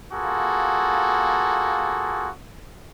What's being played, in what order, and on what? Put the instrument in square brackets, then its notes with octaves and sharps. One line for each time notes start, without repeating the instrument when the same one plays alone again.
[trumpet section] A#3 F4 F#4 G#4 A4